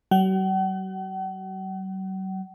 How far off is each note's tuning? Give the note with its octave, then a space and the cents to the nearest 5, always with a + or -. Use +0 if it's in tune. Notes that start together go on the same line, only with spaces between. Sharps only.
F#3 +45 F#5 +45